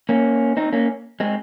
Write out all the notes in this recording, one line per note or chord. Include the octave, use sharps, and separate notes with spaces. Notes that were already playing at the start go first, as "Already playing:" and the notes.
A#3 C#4
C4 D#4
A#3 C#4
G#3 C4